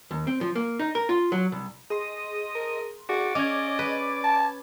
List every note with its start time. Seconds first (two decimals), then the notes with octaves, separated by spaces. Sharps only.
0.11 D#2
0.27 C4
0.41 F3
0.55 A#3
0.79 D#4
0.95 A#4
1.09 F4
1.32 F#3
1.52 C2
1.90 G#4 D#5 C6
2.55 A#4
3.09 F#4 G#4 D5
3.35 C#4 D#5 D6 G#6
3.79 B4
4.24 A5